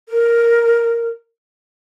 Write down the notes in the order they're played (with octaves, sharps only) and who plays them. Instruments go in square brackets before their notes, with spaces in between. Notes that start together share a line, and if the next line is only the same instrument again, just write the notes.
[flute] A#4